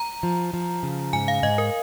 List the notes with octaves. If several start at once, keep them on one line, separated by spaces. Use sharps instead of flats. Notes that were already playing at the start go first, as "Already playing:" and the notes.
Already playing: A#5
F3
F3
C#3
G#2 G#5
F5
G#2 D#5
A#4